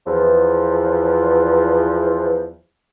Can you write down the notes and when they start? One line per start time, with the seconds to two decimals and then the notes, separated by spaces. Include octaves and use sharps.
0.06 E2 F3